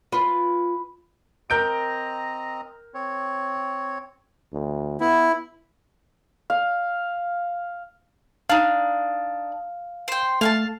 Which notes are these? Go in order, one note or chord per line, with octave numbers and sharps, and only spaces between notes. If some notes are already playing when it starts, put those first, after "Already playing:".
F4 B4
C4 A#4 D#5 A#5 G6 D7
C4 C#5
D2
B3 E4
F5
D4 D#4 F5
C5 G5
A3 F5 G#5 A5